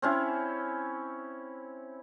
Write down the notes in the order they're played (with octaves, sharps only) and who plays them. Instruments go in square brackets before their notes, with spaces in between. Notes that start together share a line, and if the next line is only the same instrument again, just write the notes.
[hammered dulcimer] C4 C#4 E4